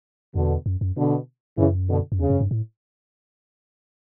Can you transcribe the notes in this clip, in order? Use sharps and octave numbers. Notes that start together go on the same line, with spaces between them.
E2 B2 D3
F#2
F#2
B2 D3
F#2 C#3 E3
B2 D3
F#2
E2 C#3
F#2
G2
A2